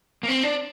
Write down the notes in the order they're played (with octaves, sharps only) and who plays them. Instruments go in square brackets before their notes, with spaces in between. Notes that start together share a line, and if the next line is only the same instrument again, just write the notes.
[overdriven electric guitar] A#3
C4
D4